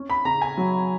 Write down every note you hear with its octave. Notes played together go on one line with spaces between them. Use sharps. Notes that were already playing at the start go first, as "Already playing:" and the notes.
Already playing: C#4
B5
C#3 A#5
G#5
F#3